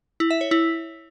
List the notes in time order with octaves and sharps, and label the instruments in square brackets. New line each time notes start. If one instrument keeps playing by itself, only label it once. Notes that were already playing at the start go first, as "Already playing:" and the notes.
[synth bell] E4
E5
C#5
E4